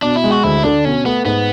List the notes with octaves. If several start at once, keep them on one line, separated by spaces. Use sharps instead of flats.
B2 D4
E4
G#3
F#4
D2 E4
D3 D4
B2 C#4
A3 B3
G#2 B3